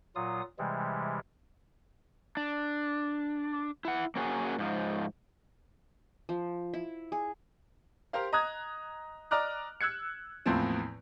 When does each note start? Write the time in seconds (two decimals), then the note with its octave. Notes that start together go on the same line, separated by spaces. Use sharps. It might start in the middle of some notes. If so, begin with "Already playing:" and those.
0.16 A#2 F#3 F4 D#6
0.59 C3 E3 G3 G#3
2.37 D4
3.85 E4 F#5
4.16 A#3 C#4 F#4 G#4
4.59 G#2 F3
6.29 F3
6.74 E4
7.12 G#4
8.13 G4 A#4 C5 F5
8.33 D#5 A#5 D#6 F#6 G#6
9.31 D5 D#5 A#5 D6 F6 F#6
9.81 E6 F#6 G#6 C#7
10.46 E2 A2 E3 F3 A#3 C4